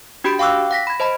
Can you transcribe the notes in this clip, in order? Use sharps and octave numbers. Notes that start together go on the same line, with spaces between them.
D4 F#4 G4 B5 G6 D7
F5 G5 C#6 D6 E6 F#6
F#5 A#6 B6
B5 G#6
C5 D#5 A5 B5